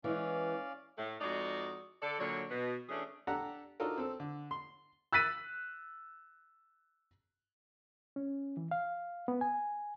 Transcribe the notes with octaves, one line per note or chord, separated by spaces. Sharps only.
E3 G#3 C#4 D5 F5
A2
F2 G#3 D#4 F#4 D5
D3 A4 D5
A#2 D3 F#3 C#5
B2
E3 A3 C#4 D4 G#4
D4 G4 A4 F#5 A#5
D4 D#4 F4 F#4 A4 A#4
C4 A4
D3
C6
E6 F#6 A6 B6 D#7
C#4
E3
F5
B3
G#5